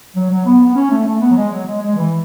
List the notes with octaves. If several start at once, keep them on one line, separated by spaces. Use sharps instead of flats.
F#3
F#3
B3
B3
C#4
A3
A3
B3
F#3
G#3
F#3
G#3
G#3
E3